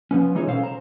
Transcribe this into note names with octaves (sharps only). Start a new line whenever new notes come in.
F3 B3 C#4
E3 G#3 D#4 F4 G#4 C#5
B2 C#4 A4 C5 F5
C5 A#5